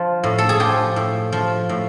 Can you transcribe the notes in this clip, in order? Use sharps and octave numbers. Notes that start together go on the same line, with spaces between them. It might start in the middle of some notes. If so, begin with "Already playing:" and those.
Already playing: F3
A2
A4
G#4
F3 G4
A2
F3
A2